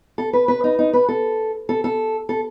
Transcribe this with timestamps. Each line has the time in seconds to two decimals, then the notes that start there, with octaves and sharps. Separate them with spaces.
0.18 A4
0.33 B4
0.48 B4
0.64 D#4
0.79 D#4
0.93 B4
1.08 A4
1.69 A4
1.84 A4
2.29 A4